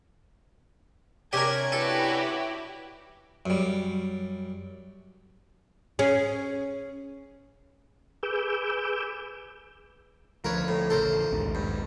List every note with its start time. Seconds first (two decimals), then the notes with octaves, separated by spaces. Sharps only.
1.33 C3 C#4 D4 G4 A#4 G#6
1.72 E4 F#4 G4 A4 B4
3.46 F#2 G3
5.99 C#4 G#4
8.23 G#4 B4 D6 E6 G6
10.45 D2 F3 A#4 B4 C#5
10.68 A2
10.90 A1 C#3 A4 A#4 C5
11.31 A#1 D#2 G#2
11.55 G2